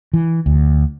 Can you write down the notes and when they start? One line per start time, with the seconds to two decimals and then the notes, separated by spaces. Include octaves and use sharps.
0.14 E3
0.46 D2